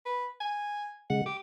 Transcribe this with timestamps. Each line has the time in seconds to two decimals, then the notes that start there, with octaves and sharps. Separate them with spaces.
0.06 B4
0.41 G#5
1.10 C#3 G#3 F#5
1.26 G4 D6